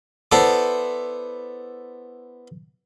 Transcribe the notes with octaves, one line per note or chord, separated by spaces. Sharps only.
B3 E4 A4 C5 D5